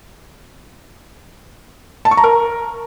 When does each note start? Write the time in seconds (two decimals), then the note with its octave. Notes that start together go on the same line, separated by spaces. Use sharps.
2.05 A5
2.11 C#6
2.17 A#5
2.24 A#4